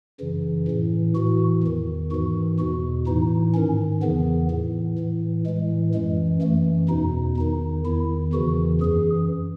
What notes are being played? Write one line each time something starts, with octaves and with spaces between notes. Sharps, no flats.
F#2 C#3 E3
A2 E3
A2 E3 F#4
E2 D#3
G#2 E3 F#4
E2 B2 F#4
A2 E3 D#4
G#2 D#3 C#4
E2 C#3 E3 B3
A2 E3
A2 E3
A2 E3 G#3
F#2 E3 G#3
F#2 E3 A3
E2 B2 D#4
E2 D#3 D#4
E2 D#3 E4
E2 C#3 E3 F#4
F#2 E3 G#4